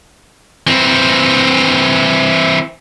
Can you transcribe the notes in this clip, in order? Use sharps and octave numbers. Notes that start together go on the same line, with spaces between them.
E3 C4